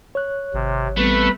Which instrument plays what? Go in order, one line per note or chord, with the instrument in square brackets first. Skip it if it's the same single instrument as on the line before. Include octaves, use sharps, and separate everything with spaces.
[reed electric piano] C#5 F#6
[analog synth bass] G#1 [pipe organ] C3
[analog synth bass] A1 [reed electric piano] G3 B3 C4 [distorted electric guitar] A3 [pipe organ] B4 B5